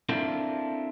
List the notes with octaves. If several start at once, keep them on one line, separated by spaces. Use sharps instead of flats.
C4 D4 E4 F4 A4 A#4